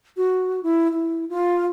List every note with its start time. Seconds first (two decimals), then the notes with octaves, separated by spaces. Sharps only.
0.17 F#4
0.63 E4
0.91 E4
1.29 F4